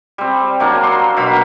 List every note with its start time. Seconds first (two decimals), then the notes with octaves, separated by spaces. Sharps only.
0.18 G3 C4
0.60 F#3 A#3 D4
0.83 C6
1.16 B2 F#3 F5 B5